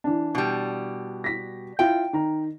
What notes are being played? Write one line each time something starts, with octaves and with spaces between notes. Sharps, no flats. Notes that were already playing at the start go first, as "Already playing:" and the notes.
E3 D4
B2 G3
A#6 B6
E4 F4 G5
D#3 A#5